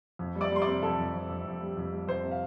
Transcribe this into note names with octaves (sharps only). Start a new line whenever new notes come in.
F2
G3
D5 D6
G3 C6
D5 D6
C3
F2 A4 A5
F2
F2
F2
F2
G3
F2
G3
F2 C5
C3
F5